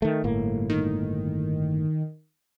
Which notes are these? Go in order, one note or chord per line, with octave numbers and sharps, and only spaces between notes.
D#3 A3
G1 A2 A#3
D#3